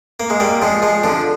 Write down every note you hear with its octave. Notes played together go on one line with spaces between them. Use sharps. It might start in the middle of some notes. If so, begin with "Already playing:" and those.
A#3
G#3
G3 A#3
F3 G#3
F3 G#3
D3 F3